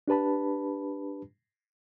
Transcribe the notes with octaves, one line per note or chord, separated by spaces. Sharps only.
D4 G4 B4 A5 B5